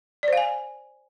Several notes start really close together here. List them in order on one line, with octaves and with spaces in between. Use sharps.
D5 C5 F5 G#5